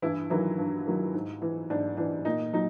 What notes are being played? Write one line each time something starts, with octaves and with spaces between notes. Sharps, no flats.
G2 E3 E4
D#3 E3 F#3 E4
G2
D#3 F#3
G#2
E3
G#2 D4
E3 D4
A#2 D#4
F#3 D#4